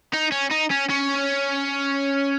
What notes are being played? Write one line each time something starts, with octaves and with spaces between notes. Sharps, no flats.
D#4
C#4
D#4
C#4
C#4